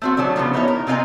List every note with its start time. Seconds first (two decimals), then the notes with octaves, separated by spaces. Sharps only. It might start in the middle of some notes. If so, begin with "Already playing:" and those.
0.02 A3 C4 F#4
0.17 D3 D#3 F#3 A5
0.36 C#3 E3 F3 B3
0.53 B3 D#4 E4 F#4 C#5
0.68 A#4
0.87 C3 C4 F4 D#5 G#5 A#5